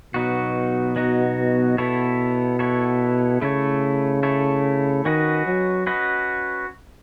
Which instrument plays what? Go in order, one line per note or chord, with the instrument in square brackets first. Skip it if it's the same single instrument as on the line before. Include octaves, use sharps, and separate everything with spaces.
[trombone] B2 [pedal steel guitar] F#3 B3 D#4 F#4
[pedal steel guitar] F#3 B3 D#4 F#4
[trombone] B2 [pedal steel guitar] B3 E4 A4 C#5
[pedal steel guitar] B3 E4 A4 C#5
[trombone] C#3 [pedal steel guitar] A3 E4 A4 C#5
[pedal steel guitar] A3 E4 A4 C#5
[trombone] D#3 [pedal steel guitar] C#4 F#4 B4 D#5
[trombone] F#3
[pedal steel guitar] C#4 F#4 B4 D#5